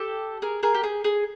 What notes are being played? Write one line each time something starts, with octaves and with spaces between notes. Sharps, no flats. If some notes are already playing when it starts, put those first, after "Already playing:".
Already playing: G4 A4
G#4 A#4
G#4 A#4
G4
G#4
G#4